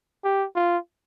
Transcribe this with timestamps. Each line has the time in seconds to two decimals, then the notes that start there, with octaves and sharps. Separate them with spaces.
0.24 G4
0.56 F4